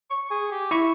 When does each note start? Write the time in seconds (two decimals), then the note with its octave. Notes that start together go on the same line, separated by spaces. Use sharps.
0.10 C#6
0.30 G#4
0.51 G4
0.71 E4 E5 C#6